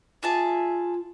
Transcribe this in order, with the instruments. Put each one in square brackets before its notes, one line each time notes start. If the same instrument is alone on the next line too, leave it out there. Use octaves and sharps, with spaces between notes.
[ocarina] F4 [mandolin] G#4 E5 A5